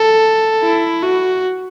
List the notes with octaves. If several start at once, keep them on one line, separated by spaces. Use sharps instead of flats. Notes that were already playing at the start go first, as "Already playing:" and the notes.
Already playing: A4
E4
F#4